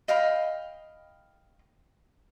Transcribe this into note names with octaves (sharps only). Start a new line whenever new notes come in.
D#5 F5 G5 B5